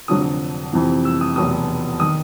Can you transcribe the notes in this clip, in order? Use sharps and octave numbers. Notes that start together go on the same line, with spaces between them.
F1 F2 D3 F#3 D#6
F2 C3 E3
E6
D#6
F1 E2 B2 F#3 D#6
D#3 D#6